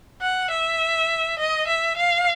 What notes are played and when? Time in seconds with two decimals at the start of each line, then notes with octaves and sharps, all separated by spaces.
0.21 F#5
0.51 E5
1.39 D#5
1.68 E5
1.97 F5